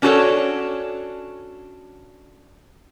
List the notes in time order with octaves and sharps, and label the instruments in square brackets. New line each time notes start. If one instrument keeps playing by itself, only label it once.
[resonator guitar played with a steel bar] C#4 D4 F#4 G4 A4 C#5